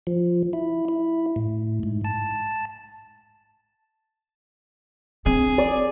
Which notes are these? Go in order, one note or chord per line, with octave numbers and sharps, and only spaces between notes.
F3
E4
E4
A2
G#2
A5
C4 D4 G#4
D5